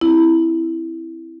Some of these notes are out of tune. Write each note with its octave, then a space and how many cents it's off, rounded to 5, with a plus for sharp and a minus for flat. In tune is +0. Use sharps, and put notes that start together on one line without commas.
C4 +0 E4 +0